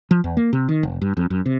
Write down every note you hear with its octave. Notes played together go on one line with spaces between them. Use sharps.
F3
E2
A#3
C3
D#3
F1
G2
F2
F#2
C3